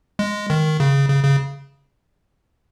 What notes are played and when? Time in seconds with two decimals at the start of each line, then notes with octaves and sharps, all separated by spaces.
0.19 G#3
0.50 D#3
0.80 C#3
1.09 C#3
1.24 C#3